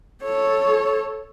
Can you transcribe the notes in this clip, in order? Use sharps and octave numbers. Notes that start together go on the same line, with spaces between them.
A4 C#5